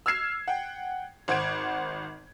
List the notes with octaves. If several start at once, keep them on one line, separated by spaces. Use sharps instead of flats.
E6 F6 G#6 C7 E7
F#5 G5
G#1 C5 F#5 G#6 D7